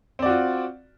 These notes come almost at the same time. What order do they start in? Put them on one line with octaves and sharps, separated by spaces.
C4 D5 F#4 F4